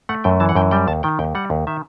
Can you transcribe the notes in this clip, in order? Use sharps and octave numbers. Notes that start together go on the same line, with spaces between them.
A3 F#5
F#2 G5
E3 A5
F#5
F#2 G5
G3 G5
D#2 A5
D#3 G5
D#2 G5
G3 F#5
D#2
D#3 E5